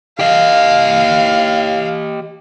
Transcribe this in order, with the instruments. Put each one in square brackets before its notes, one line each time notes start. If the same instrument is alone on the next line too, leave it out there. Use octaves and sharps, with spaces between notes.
[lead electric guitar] G4 D#5 [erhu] F5